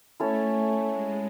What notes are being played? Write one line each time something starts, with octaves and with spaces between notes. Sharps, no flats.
A3 C#4 E4 A4 C#5
G#3